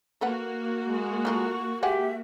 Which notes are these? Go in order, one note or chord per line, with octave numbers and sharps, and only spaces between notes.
A#3 F#4 A4 B4 F#5
G#3
A3 F4 A#4 C#6
G#3 G4 E5 F#5 G#5